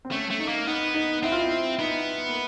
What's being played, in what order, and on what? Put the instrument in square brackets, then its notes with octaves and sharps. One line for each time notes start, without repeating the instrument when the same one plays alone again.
[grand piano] C4
[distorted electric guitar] A3 [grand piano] C#4
[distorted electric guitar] A3
[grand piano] D#4
[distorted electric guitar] A#3
[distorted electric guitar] B3 [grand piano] D#4
[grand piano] D#4
[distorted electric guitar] C4 [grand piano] E4
[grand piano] F4
E4
[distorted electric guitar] B3 [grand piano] D#4
[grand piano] A#3